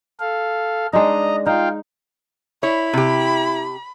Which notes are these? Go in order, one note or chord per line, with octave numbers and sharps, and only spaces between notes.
A4 F5
G#3 D4 D#4 D#5 A#5
D#4 F4 F5 G5
E4 C#5 B5
C3 G4